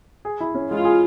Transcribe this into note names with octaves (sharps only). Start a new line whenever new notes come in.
G#4
E4
C#4
G#3 F4
G#4